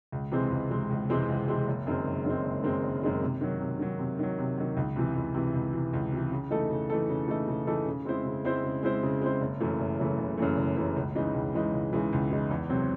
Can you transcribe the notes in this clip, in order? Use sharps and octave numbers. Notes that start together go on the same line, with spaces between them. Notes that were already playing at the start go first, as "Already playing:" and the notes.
C#2
C3 E3 G#3 C4
C#2
C3 E3 G#3 C4
C#2
C3 E3 G#3 C4
C#2
C3 E3 G#3 C4
F#1
F#2 D#3 G#3 C4
F#1
F#2 D#3 G#3 C4
F#1
F#2 D#3 G#3 C4
F#1
F#2 D#3 G#3 C4
C3
D#3 F#3
C3
D#3 F#3
C3
D#3 F#3
C3
D#3 F#3
C#2
C3 E3
C#2
C3 E3
C#2
C3 E3
C#2
C3 E3
C#3
E3 A3 D#4 A4
C#3
E3 A3 D#4 A4
C#3
E3 A3 D#4 A4
C#3
E3 A3 D#4 A4
C#3
G#3 C4 E4 C5
C#3
G#3 C4 E4 C5
C#3
G#3 C4 E4 C5
C#3
G#3 C4 E4 C5
F#1
F#2 C#3 E3 A3
F#1
F#2 C#3 E3 A3
F#1
F#2 C#3 E3 A3
F#1
F#2 C#3 E3 A3
C#2
C#3 E3 G#3 D#4
C#2
C#3 E3 G#3 D#4
C#2
C#3 E3 G#3 D#4
C#2
C#3 E3 G#3 D#4
E2
C3 F#3 C4